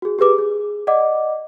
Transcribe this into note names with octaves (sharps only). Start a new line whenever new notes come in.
F#4 G#4
G4 G#4 B4 D6
G#4
D5 D#5 F#5 D6